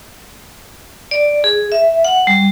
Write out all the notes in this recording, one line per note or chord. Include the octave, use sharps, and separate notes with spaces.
D5
G#4
E5
F#5
G3